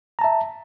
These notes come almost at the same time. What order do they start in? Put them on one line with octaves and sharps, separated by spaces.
A#5 A5 E5